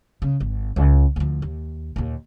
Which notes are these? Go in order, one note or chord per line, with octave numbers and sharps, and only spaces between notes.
C#3
G#1
C#2
D2 F3
D#2
D#2 A#2